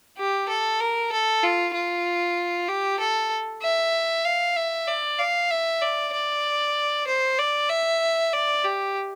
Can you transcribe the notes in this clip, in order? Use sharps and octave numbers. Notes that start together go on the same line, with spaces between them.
G4
A4
A#4
A4
F4
F4
G4
A4
E5
F5
E5
D5
F5
E5
D5
D5
C5
D5
E5
D5
G4